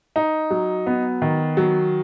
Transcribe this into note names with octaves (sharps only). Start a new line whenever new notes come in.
D#4
F#3
B3
D#3
F#3